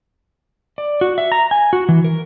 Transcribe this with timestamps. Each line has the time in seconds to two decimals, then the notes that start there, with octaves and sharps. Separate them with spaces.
0.78 D5
1.01 F#4
1.18 E5
1.32 A#5
1.51 G#5
1.73 F#4
1.89 E3
2.04 A#4